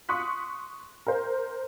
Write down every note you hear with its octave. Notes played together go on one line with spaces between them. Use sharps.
C6 C#6 D#6 F#6 B6
A#4 C5